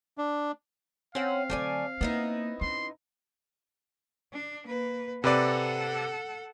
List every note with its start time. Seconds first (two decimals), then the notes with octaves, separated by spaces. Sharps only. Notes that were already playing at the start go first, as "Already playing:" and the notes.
0.18 D4
1.15 C4 C#4 F5 F#5
1.50 D3 F#3 A3 D5 G#5
2.01 A#3 B3 D#4 E4
2.61 C#4 C6
4.33 D4
4.66 A#3 B4
5.24 C3 A4 B4 D5 F#5